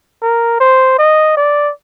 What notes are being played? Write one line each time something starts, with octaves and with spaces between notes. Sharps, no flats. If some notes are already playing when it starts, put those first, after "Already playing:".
A#4
C5
D#5
D5